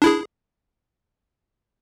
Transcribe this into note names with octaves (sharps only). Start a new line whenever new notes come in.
D4 E4 G#4